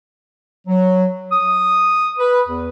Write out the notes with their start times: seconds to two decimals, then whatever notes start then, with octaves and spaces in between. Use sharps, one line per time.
0.67 F#3
1.32 D#6
2.18 B4
2.47 E2